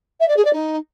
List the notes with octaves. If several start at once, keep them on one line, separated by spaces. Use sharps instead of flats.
E5
D5
G#4
D5
D#4